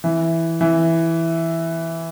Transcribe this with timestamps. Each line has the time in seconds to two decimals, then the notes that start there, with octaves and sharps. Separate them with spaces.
0.04 E3
0.61 E3